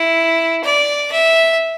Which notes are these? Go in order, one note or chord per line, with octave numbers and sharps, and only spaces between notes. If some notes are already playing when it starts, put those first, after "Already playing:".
Already playing: E4
D5
E5